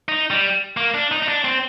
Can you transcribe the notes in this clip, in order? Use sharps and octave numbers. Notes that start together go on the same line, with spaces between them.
D#4
G3
A#3
D4
D#4
D#4
D4
C4